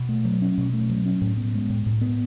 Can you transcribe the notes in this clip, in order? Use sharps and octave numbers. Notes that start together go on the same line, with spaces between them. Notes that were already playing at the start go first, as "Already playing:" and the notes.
Already playing: B2
A3
F#3
C#4
B2
A3
F#3
C#4
A2
B3
G#3
A2
A2
B3